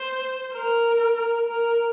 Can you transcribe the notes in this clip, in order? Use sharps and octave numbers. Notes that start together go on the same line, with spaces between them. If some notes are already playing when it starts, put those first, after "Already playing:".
Already playing: C5
A#4
A#4
A#4